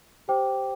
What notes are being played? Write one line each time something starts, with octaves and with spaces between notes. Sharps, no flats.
G4 C5 G5 D6